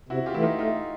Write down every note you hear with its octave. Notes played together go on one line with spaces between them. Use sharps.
C3 E4 F#4
F4 G4
E3 A3 E4
D#4 F4
A3 D#4 F4